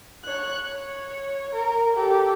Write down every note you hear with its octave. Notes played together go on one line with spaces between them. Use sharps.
C#5 F#6
C#5
A#4
G4 A4